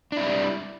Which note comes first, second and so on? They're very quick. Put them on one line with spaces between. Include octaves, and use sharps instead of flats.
D4 E4 G3